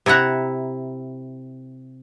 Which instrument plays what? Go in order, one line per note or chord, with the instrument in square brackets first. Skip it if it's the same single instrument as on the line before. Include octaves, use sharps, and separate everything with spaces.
[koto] C3 E4 E5 F#5 A#5